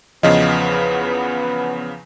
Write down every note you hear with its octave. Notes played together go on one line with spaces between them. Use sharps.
E2 C#3 F3 B3 D#5